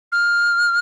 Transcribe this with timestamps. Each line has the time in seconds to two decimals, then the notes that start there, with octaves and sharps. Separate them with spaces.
0.12 F6